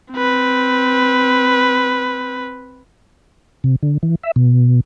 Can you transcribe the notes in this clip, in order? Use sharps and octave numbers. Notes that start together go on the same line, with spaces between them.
C4 B4
C3
D3
E3
E5
B2